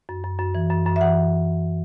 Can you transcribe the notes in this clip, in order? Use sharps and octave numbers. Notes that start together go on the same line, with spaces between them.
F#2
F#2
F#2
E3
F#2
F#2
E5
E3 F#5